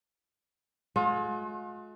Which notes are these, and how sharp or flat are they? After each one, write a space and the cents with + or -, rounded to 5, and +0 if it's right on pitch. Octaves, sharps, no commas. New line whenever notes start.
G#3 +45 F4 +45